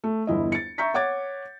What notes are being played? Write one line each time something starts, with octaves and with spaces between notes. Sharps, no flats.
A3
G1 E2 E4 D#5
A6 C#7
E5 A#5 C#6 G6 B6
C#5 F#5 D6 G#6 A6